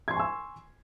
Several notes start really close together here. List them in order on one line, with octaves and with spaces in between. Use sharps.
G#6 C6 C#6 G#5 E6